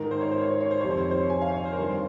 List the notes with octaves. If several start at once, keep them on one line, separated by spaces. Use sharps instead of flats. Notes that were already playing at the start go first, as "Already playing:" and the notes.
Already playing: G#2 D#3 A#4
C5
C#5
C5
C#5
C5
C#5
C5
F2 C3 D#3 C#5
C5
C#5
C5
G#5
F5
C#5
C5
A#4
G2 D#3 C5